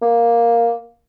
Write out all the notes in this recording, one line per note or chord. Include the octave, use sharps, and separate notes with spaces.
A#3